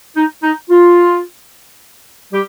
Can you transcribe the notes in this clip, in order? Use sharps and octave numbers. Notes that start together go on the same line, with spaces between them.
D#4
D#4
F4
G3 G4